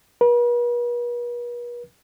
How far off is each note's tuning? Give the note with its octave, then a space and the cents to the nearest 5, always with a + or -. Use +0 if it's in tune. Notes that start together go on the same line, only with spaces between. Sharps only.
B4 -45